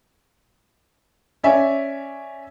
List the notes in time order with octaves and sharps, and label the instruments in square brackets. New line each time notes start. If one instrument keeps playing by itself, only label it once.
[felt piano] C#4 D5 E5 G#5